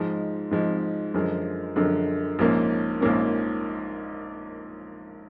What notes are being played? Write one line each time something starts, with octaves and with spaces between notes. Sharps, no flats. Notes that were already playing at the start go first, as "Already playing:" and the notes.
Already playing: G#2 F3 G#3
G#2 F3 G#3
F#2 D3 F3 G#3
F#2 D3 F3 G#3
A#1 G#2 F3 A#3 C#4
A#1 G#2 F3 A#3 C#4